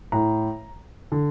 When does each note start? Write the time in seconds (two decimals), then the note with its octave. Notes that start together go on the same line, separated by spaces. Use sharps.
0.12 A2 A#5
1.12 D3